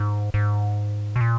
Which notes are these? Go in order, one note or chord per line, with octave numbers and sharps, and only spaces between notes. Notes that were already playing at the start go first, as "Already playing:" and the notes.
Already playing: G#2
G#2
B2
A#2